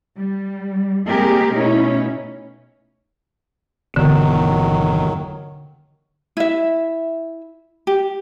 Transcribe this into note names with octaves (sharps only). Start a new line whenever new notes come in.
G3
G#3 A#3 C4 G4 G#4 A#4
B2 A3 C#4 D#4 E4
G1 E2 B2 D3 D#3 F#3
E4 E5
G4